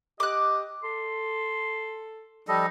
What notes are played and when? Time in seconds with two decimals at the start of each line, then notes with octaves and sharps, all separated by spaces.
0.20 G4 D#5 D6 F#6
0.83 A4 C6
2.48 F3 G3 D#4 A4 D#5